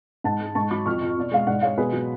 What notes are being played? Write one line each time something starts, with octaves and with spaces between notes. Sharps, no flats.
G#2 F#5 A5
G#3
G#2 A5 C#6
F#3 B5 D6
F2 C#6 F6
F2
B2 D5
G#3 F5
G#2 D5 F#5
G#3 C#5 F5
B2 G#4 B4
F#3